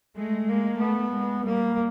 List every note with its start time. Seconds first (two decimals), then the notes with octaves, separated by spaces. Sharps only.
0.17 G#3 A3
0.48 G#3 A#3
0.81 A3 B3
1.13 G#3
1.45 G3 A#3